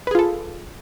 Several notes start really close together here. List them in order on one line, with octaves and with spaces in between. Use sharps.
B4 G#4 F4 A4